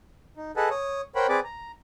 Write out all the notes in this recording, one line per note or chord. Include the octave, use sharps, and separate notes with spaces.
D#4
G#4 A4 B4 D#5 F#5 A5
C#5 D#6
A#4 C5 C#5 F#5 G5 B5
C4 G#4 B4 D5 D6
A#5